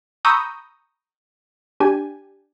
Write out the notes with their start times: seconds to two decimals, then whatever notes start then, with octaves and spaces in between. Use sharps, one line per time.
0.25 A#5 B5 C#6 D#6 E6 G6
1.80 D4 G4 G#5